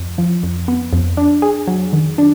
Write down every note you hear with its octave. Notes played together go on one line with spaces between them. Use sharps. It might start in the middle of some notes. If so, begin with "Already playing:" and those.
Already playing: F2
F3
F2
B3
F2
D4
G#4
F#3
D#3
D4